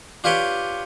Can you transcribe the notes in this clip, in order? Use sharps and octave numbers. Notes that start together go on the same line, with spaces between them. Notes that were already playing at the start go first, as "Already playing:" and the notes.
D4 F4 G4 B4 C#5 G5